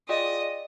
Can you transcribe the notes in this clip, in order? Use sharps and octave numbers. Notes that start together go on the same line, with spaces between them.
F4 G#4 D5 D#5 G5